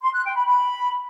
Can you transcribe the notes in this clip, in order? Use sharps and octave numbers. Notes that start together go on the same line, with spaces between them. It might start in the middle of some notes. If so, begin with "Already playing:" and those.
C6
F#6
G5
B5
B5